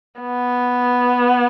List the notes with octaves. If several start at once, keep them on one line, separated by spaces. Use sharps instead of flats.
B3